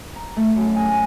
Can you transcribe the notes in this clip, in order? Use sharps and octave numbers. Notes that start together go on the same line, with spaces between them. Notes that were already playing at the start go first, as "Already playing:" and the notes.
A#5
A3
F#2
G#5